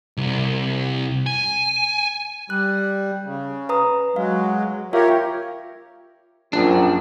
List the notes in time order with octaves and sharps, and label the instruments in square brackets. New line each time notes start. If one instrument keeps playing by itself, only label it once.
[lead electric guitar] C2
G#5
[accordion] G3 [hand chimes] F#6
[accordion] C#3
[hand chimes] B4 A#5 D#6
[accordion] F#3 G#3 [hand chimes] F5
[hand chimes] F4 E5 F5 [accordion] G4 A#4 C#5
[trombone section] A#1 [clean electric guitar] F#2 D4